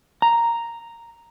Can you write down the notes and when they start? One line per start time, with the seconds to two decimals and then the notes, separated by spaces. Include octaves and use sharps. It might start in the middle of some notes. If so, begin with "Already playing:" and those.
0.22 A#5